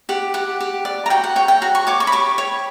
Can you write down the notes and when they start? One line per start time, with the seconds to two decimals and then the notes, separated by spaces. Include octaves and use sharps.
0.09 G4 F#5
0.34 G4 F#5
0.60 G4
0.85 D5
1.06 A#5
1.10 F#4 G5
1.24 F#5
1.36 C#5 G5
1.48 G5
1.62 F#4 A#5
1.75 C#6
1.87 C#5 D6
2.00 C#6
2.07 B5
2.12 G4 C#6
2.38 C#5